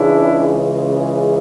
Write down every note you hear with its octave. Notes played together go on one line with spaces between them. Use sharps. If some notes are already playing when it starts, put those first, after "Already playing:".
Already playing: C#2 C#3 E3 G#3 D4 E4